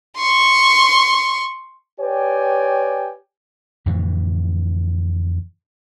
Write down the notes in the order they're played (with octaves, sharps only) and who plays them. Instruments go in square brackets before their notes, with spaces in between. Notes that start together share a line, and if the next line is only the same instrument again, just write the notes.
[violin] C6 C#6
[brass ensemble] G4 B4 C#5 D5 G5 G#5
[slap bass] F2 A2 D3 E3